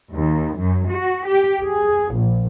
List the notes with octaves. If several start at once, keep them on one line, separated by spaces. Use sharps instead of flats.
D#2
F#2
F#4
G4
G#4
A#1